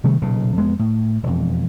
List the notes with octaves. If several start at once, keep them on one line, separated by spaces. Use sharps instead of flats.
C3 D#3 G3 A3
B1 A#2 C#3
F2 G#3 B3
A2
E1 F2